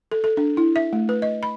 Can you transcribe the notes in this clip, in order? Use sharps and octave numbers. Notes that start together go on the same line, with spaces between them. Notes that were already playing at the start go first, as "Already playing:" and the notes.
A4
A4
D4
E4
E5
A3
B4
D#5
B5